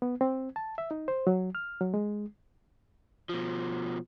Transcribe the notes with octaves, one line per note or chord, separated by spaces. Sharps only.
B3
C4
A5
E5
D#4
C5
F#3
F6
F#3
G#3
B2 F3